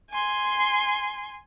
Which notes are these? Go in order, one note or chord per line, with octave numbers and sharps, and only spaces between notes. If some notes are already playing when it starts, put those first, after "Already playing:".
G#5 C6